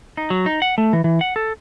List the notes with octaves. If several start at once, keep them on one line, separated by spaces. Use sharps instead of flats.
D#4
F#3
D#4
F#5
A3
E3
E3
F#5
A4